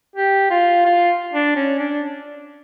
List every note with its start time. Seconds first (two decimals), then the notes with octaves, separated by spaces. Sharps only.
0.16 G4
0.50 F4
0.86 F4
1.33 D4
1.56 C#4
1.79 D4